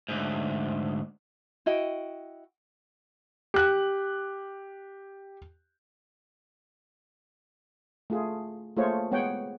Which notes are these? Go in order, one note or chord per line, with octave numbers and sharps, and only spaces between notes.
D2 G#2
E4 F#4 D#5 G5
G4 F#6
A3 F4 G#4
A3 A#3 F4 G#4 C5 C#5
G#3 B3 C#5 F#5 G5